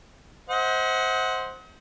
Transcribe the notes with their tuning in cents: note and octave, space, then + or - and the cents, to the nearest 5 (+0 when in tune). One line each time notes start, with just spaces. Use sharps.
C5 +0 D#5 +45 F#5 +0